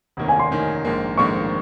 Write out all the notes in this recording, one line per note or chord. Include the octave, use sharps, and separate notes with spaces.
F1 D#2 D#3 A#3 C#4
G#5
C6
F1 D#2 D#3 A#3 C#4
A#1 G#2 D#3 A#3
A#1 G#2 D#3 A#3 C#6